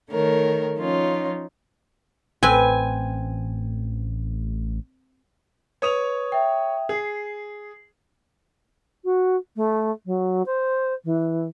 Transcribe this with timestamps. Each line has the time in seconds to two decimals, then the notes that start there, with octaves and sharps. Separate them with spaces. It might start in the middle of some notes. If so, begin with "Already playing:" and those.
0.11 D#3 A3 A#4 C#5
0.77 F3 C#4 D#4 F4 C#5
2.43 A1 C4 B4 G#5
5.82 B4 C#5 D#6 F7
6.32 E5 G5
6.89 G#4 C7
9.04 F#4
9.56 A3
10.06 F#3
10.46 C5
11.04 E3